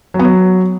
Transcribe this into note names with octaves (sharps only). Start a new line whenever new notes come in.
F#3
B3
F#3